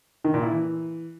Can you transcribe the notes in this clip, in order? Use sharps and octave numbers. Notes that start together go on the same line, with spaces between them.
D#3
A#2
E4
E3